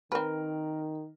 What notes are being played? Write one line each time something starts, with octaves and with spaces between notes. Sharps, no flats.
D#3 C4 A#4 B4